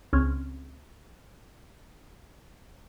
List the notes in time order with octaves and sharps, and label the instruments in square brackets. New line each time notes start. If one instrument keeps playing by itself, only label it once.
[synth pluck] C#2 C4 C#4 F6